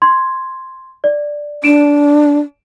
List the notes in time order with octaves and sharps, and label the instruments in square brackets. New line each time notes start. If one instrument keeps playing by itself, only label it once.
[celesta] C6 G#6
D5
[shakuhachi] D4 [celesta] D7 E7